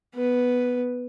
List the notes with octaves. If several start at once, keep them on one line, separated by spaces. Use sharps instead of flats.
B3 B4